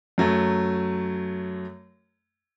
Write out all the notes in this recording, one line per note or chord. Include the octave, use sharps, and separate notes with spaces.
F#2 F#3 A3